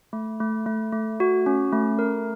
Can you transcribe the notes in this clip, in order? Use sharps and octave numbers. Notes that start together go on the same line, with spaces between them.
A3
A3
A3
A3
F#4
C#4
A3
A#4